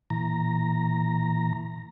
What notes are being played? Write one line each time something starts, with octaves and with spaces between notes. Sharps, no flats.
A#2 E3 A#5